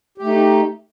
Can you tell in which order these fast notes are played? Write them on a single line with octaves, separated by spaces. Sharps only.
G4 A3 D#4